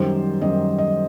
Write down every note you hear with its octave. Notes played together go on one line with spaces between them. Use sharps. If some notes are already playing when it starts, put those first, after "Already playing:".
Already playing: F#2 D#3 G3 C5
F#2 D#3 G3 D#5
D#5